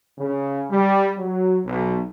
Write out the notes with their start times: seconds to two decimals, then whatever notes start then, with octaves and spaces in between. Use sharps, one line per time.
0.18 C#3
0.71 G3
1.18 F#3
1.66 B1